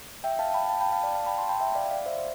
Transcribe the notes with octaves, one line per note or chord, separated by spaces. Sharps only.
E5 G5
F5 A5
G5 B5
F5 A5
G5 B5
F5 A5
D5 F5
F5 A5
G5 B5
A5 C6
G5 B5
E5 G5
D5 F5
D5 F5
C5 E5
C5